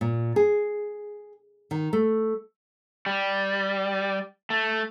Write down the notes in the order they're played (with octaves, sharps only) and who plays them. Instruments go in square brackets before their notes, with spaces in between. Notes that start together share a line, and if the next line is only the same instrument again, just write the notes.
[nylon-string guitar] A#2
G#4
D#3
A3
[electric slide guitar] G3
A3